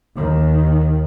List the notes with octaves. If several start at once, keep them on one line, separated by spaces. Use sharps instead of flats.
D#2 D#3